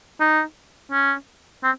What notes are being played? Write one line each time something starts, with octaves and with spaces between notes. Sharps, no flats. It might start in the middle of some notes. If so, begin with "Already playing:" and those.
D#4
C#4
C4